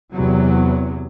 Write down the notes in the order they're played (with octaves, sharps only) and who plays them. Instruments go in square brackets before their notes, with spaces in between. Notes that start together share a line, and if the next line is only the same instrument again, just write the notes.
[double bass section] E2 C3 F#3